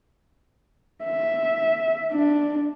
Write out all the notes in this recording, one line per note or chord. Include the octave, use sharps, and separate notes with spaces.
E5
D4